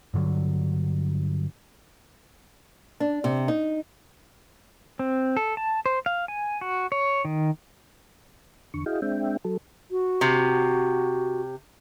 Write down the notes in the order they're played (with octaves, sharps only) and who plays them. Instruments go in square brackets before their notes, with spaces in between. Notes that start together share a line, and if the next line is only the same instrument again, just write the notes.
[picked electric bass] G2 D3 F#3
[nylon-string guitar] D4
C3
D#4
[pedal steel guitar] C4
A4
A5
C5
F5
G#5
F#4
C#5
D#3
[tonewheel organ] E2 D3 C#6
E4 F#4 G#4 D#5 F5 G5
G#3 C4 D4 E5 G5
F#3 A4
[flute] F#4
[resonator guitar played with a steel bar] C3